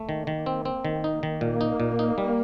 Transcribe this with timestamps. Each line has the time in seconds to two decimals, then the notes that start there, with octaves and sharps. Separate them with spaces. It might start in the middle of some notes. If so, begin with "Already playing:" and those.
Already playing: A3 A#3
0.09 D#3
0.27 D#3
0.46 C4
0.65 C4
0.85 D#3
1.04 D#4
1.23 D#3
1.41 A#2 A#3
1.61 D#4
1.80 A#2
1.99 D#4
2.18 G3